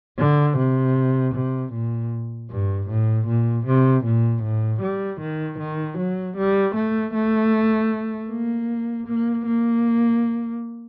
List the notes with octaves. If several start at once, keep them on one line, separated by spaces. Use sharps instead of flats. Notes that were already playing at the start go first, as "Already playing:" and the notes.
D3
C3
C3
A#2
G2
A2
A#2
C3
A#2
A2
G3
D#3
D#3
F#3
G3
A3
A3
A#3
A#3
A#3